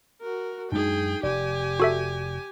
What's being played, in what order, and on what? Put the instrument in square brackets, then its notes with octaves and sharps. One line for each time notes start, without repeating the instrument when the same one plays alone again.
[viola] F#4 A#4
[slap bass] F#2 G#3 D4 [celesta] D#4 [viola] G#4 G5
[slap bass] F1 [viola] G4 G#5 [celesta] D5
[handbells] F#4 A4 E5